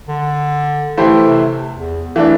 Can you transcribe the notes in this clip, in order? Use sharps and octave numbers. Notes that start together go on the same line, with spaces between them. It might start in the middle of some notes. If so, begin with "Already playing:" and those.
D3
E3 A3 E4 G4 C5
C3
E2
E3 A3 D4